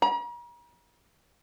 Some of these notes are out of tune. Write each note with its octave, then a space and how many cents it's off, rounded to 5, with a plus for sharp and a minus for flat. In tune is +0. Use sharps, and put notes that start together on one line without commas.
A#5 +45